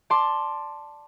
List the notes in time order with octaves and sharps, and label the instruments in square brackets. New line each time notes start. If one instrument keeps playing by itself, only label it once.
[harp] D5 A5 C6 D6